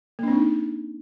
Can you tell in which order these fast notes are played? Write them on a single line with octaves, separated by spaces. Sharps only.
A#3 D4 C4 D#4